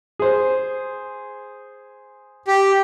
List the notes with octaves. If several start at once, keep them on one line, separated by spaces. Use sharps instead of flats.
G#4 C5
G4